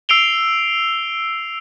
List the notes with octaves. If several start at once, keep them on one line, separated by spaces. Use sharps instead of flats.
E6 C7 D7 F7 G7